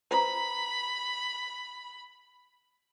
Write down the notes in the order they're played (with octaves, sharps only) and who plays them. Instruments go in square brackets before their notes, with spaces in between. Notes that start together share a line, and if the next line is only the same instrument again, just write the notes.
[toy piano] B4 C5 A#5 [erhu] B5